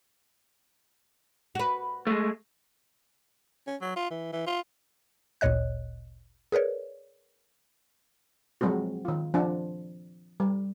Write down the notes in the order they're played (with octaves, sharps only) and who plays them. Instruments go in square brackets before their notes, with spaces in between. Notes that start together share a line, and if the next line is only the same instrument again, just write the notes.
[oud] F#4 B4
[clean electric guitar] G#3 A3
[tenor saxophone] C#4
F#3
F4
E3
E3
F4
[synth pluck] G#1 D2 A#2 C#5 D#5 F#6
G#4 A#4 B4 C#5 D5
[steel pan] F3 F#3 G#3 C4 F#4
D#3 F4
F3 D4
G3